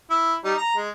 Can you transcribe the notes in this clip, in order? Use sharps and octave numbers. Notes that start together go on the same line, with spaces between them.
E4
G3 D#4
A#5
G#3